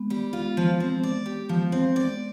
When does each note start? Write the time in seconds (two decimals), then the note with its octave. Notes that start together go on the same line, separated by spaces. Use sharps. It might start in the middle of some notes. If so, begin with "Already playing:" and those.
Already playing: G#3 B3
0.10 G3
0.33 F4
0.57 F3
0.80 C4
1.03 D5
1.26 G4
1.49 F3
1.72 C4
1.96 D5